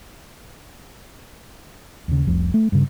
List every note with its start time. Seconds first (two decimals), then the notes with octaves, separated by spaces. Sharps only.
2.08 D#2 C#3
2.27 F1 C2 F3
2.54 A3
2.72 G2 C#3